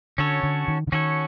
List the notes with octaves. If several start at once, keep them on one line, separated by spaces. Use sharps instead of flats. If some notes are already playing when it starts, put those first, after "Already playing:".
D3 C#4 F#4 A4 C#5
D3
D#3
D3
D#3 C#4 F#4 A4 C#5